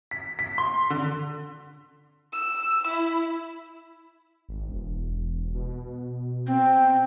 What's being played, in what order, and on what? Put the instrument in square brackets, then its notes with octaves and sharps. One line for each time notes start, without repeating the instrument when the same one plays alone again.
[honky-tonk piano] B6
B6
C6
D3
[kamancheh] E6
E4
[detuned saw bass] G#1
E1
B2
[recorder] C4